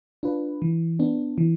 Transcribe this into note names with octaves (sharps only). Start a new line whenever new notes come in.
D4 F4 B4
E3
B3 D4
E3